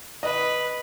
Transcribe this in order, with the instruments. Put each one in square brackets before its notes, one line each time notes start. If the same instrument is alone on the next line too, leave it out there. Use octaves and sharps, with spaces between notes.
[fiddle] B4 [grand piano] D#5